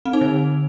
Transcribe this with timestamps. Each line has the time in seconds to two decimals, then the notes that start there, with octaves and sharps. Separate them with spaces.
0.05 C4
0.13 D#4
0.21 D3